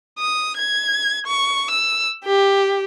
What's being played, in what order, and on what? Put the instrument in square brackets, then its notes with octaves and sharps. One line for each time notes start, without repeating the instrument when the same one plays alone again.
[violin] D#6
G#6
C#6
E6
G4